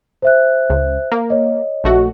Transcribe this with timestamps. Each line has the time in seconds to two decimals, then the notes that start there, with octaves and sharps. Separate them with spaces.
0.22 C5 E5 F#6
0.70 C#2
1.12 A#3
1.30 C#5 D#5
1.84 A#1 A3 F#4